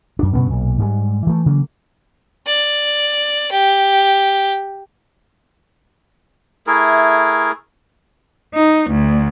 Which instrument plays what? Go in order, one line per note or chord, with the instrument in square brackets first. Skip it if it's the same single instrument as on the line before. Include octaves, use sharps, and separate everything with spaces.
[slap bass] F#2 D4
G2 B2 B3 C#4
B1 A#2
G#2 G3 G#3
E3 A3
C#3 E3 F#3 A#3
[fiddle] D5
G4
[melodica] A3 E4 G#4 A#4
[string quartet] D#4
D2